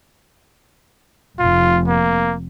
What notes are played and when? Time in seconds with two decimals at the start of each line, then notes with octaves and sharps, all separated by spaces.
1.39 F1 F4
1.88 A#3